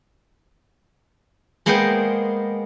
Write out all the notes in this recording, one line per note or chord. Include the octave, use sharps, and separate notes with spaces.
G#3 A#3 B3 C5 D#5 G5